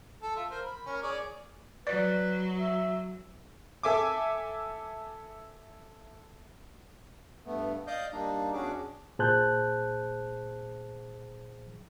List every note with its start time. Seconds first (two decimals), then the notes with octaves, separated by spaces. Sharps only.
0.22 A4
0.36 F4 E5
0.50 A#4 C5
0.65 B5
0.86 C#4 A#4
1.03 G#4 C#5 D5
1.87 F#3 B4 D5
2.59 E5
3.83 A4 E5 G#5 D6
7.45 G2 A3 B3
7.87 D5 D#5 F5 D6 D#6 G6
8.13 G3 A#3 D4 D#4
8.53 E2 C#4 D4 F#4 G#4 D6
9.19 A#2 G#4 C5 A5 F#6 G6